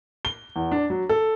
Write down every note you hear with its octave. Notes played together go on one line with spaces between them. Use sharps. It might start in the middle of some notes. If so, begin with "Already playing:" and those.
G7
E2
D4
F#3
A4